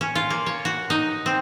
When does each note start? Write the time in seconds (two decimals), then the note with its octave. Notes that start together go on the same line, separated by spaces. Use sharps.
0.01 C#4
0.15 F4
0.30 A#3
0.46 C#5
0.65 F#4
0.90 D#4
1.26 C4